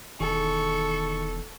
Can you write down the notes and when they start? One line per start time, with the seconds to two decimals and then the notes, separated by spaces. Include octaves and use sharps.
0.20 E1 D#3 G#4 A4 C#6